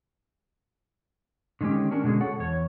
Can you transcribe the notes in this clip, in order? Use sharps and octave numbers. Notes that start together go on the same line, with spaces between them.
D3 D#3 G#3 C#4 G4
C#4 D4 A#4
B2 D3 G#3 G#4
A4 C#5 F#5
E2 C#5